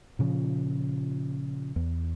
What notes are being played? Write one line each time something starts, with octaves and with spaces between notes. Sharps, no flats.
A#2 C#3 F3
E2